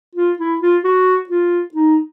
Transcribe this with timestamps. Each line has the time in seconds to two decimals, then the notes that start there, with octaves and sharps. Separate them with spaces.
0.16 F4
0.39 E4
0.61 F4
0.84 F#4
1.29 F4
1.74 D#4